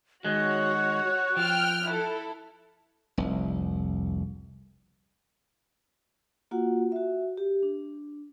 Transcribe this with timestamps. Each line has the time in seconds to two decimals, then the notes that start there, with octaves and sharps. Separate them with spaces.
0.25 D#3 G#3 F#4 C#5 F#6
1.37 F3 G5 F6
1.88 E4 A4
3.18 F1 C2
6.51 A#3 F4 F#4 F#5
6.92 F#4 E5
7.37 G4
7.63 D4